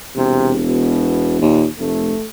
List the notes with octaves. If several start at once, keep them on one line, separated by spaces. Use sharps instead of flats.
E1 C3
B2
D#2 A#2
F1 A3